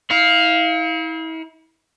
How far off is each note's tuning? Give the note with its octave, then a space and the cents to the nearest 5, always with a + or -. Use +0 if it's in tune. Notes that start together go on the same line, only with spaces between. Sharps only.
E4 -40 F5 +0